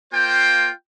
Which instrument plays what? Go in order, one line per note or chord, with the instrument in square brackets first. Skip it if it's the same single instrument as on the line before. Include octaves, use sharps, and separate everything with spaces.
[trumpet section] A#3 F4 C5 G5